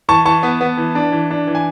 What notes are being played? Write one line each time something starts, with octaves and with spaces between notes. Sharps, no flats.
E3 A5 C#6
E3 A5 C#6
B3
B3
E3
D4
E3
D4
E3
G#5